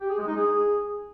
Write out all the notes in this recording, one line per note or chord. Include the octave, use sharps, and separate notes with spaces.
G4
G#4
G#3
D#4
G#4